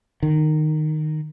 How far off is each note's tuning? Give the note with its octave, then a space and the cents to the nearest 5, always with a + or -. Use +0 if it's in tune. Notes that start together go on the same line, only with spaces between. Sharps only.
D#3 -15